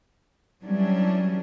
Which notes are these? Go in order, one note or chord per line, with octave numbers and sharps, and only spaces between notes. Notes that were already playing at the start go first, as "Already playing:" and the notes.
E3 F#3 G3 C#4 D4